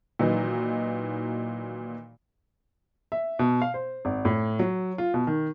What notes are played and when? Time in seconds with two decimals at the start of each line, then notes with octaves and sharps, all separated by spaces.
0.19 A#2 D#3 E3 F#3 D#4
3.12 E5
3.39 B2
3.62 F5
3.74 C5
4.05 G#1
4.25 A2
4.59 F#3
4.98 F4
5.14 B2
5.27 D#3